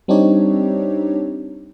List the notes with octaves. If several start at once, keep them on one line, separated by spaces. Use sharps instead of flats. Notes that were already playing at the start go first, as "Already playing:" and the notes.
G3 C4 D4 D#4 G4 C#5